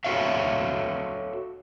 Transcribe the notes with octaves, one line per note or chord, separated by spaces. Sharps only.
F#4 A4 C#5 E5 F5